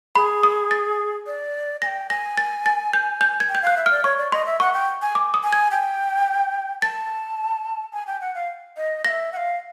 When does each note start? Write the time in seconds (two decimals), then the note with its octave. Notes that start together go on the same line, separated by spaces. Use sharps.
0.15 G#4 B5
0.43 D#6
0.71 A6
1.27 D5
1.82 G#5 A#6
1.86 G5
2.10 G#5 A#6
2.37 A6
2.66 A6
2.93 G6
3.21 G6
3.40 G#6
3.49 G5
3.55 G6
3.62 F5 F#6
3.77 E5
3.86 D5 F6
4.04 C#5 C#6
4.18 D5
4.32 D#5 C6
4.46 E5
4.60 F#5 C#6
4.73 G5
5.02 G#5
5.15 D6
5.34 D#6
5.43 G#5
5.53 G#6
5.71 G5
6.82 A5 A6
7.93 G#5
8.07 G5
8.21 F#5
8.35 F5
8.77 D#5
9.05 F5 A#6
9.08 E5
9.33 F#5
9.37 F5